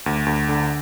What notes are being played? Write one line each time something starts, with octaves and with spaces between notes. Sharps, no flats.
D2
D2
D3